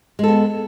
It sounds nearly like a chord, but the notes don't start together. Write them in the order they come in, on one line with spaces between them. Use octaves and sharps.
G#3 A4 B3